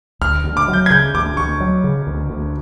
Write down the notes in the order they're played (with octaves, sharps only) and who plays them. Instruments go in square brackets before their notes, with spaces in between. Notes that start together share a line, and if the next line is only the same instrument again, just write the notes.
[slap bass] D2 [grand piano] F6
[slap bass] D2
[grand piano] D6
[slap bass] F#3
[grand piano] G6
G#6
[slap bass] C#3 [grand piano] G6
[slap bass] D2 [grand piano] D6
[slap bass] D2 [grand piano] C#6
[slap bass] F#3
C#3
D2
D2